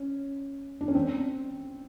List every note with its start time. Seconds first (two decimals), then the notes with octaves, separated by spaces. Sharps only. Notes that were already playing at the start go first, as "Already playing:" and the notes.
Already playing: C#4
0.81 D4
0.88 C#4
0.95 C4